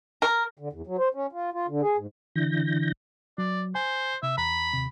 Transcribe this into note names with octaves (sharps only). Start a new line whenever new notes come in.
A#4
D3
E2
F#3
C5
C#4
F4
F4
D3
G#4
G#2
D3 E3 G6 A#6
F#3 D5
C5 G#5
C3 E5
E2 A#5 B5
D#2 C3